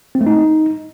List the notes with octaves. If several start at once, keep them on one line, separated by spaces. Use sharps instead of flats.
C4
A3
D#4